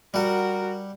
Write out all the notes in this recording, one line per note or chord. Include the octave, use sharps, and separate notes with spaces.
G3 F#4 A#4 F#5